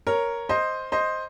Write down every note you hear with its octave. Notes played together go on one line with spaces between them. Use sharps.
A#4 C#5
C5 D#5
C5 D#5